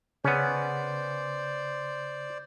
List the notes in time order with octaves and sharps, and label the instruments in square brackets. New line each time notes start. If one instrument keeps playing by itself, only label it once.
[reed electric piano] C#3 [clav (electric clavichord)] B3 C#4 [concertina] C5 D5